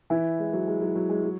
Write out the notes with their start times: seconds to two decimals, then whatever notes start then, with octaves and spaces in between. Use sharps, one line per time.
0.10 E3 E4
0.39 G#3
0.53 F#3
0.67 G#3
0.81 F#3
0.96 F#3
1.09 G#3
1.23 F#3